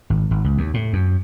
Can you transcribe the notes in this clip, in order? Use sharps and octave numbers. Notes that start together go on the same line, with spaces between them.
G#1
G#1
C#2
D#2
A2
F#2